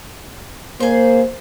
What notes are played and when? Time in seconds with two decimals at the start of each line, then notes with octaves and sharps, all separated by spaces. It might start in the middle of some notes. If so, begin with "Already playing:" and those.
0.80 A#3 G#4 C5